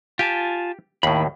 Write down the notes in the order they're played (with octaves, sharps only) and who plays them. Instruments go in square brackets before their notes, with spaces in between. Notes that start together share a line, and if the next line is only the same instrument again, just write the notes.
[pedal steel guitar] F4 G#5 A5 [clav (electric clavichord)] G4
[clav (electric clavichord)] D#2 A2 [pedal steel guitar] D#3 B5